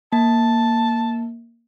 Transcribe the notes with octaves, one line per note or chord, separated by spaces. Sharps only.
A#3 A5